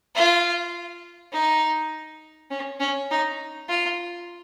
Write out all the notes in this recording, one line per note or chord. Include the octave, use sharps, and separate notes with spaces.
F4
D#4
C#4
C#4
D#4
F4